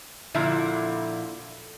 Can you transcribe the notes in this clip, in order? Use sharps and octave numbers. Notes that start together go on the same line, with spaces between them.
A#2 D3 F3 E4